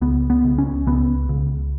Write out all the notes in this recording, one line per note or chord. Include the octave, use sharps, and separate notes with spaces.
C#2 B3
B3
C#2
C#4
C#2 B3
C#2